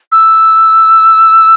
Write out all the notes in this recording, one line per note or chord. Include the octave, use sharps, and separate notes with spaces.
E6